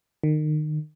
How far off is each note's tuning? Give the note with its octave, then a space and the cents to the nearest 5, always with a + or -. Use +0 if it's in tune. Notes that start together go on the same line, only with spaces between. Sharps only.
D#3 -30